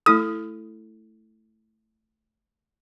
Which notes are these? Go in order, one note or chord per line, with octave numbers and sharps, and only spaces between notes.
A3 E4 A4 D#6